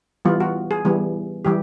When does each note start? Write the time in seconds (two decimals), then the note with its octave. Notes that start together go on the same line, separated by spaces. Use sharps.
0.25 E3 G3 B3 F4
0.40 F#4
0.71 G#4
0.85 E3 G3 B3
1.45 E3 G3 G4